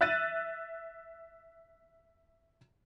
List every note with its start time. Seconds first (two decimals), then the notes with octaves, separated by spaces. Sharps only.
0.01 E5 F#6 A6 D#7